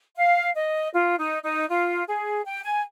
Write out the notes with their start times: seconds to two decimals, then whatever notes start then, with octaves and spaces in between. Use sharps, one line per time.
0.16 F5
0.54 D#5
0.92 F4
1.17 D#4
1.42 D#4
1.69 F4
2.07 G#4
2.44 G5
2.63 G#5